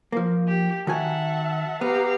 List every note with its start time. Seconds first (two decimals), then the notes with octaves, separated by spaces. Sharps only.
0.12 F3 A#3
0.47 G4
0.87 D#3 F#4 E5 F#5 G#5 A5
1.81 B3 G4 F5 A#5